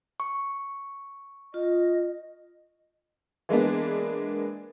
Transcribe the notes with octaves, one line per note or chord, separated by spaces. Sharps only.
C#6
F4 D#5
E3 G#3 A#3 B3 D4